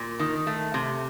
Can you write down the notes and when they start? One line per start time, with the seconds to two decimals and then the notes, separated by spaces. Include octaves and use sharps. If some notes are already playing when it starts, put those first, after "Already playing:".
Already playing: A#2
0.19 D#3
0.47 A3
0.74 C3